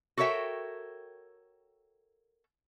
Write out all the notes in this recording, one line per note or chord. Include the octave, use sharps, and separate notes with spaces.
F#4 A4 A#4 C#5 E5 G5